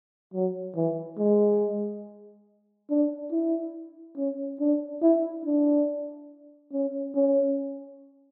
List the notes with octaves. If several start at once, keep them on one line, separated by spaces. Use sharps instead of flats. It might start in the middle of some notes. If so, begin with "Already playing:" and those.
F#3
E3
G#3
D4
E4
C#4
D4
E4
D4
C#4
C#4